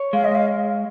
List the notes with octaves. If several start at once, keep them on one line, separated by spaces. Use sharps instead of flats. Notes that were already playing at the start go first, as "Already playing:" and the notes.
Already playing: C#5
G#3 F5
D#5
F5